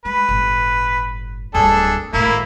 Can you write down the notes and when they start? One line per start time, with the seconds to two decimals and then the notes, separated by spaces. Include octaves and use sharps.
0.05 G#3 B4
0.29 G1 A2
1.54 D1 G2 D4 G#4 A4
2.13 G#1 A2 A#3 E4